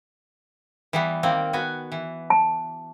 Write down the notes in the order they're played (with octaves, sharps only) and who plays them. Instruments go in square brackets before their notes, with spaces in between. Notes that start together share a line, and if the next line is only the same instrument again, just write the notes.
[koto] E3 G3 B3
D#3 A#3 C4
B3 F#4 G#5
E3
[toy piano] A5